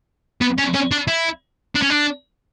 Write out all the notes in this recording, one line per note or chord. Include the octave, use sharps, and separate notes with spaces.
B3
C#4
C#4
D4
E4
D4
C#4
D4